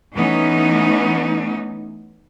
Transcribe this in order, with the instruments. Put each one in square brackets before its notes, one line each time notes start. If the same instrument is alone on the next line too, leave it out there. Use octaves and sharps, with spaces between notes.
[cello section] E3 A3 B3 C#4 D#4